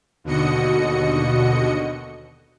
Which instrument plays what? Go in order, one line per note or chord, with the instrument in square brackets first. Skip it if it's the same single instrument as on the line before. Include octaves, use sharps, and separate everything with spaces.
[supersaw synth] D#2 B2 D3 F#4 D#5 C#7